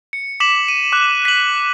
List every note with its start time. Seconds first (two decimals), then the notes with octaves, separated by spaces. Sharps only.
0.13 C#7
0.40 D6 B6 E7 F#7
0.68 D#7
0.92 D6 F#6
1.25 B6 F#7